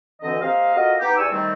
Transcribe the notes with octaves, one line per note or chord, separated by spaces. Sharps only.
D2 D3 E3 C4 D#5
A#3 C4 G4 D#5 F5
F4 F#4 A4 A#4 D#5
B3 D#4 G4
E2 G4 D5 G#5 C#6 E6
D#3 G3 A3 C4